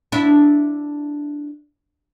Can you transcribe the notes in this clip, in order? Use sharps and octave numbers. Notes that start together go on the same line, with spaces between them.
D4 E4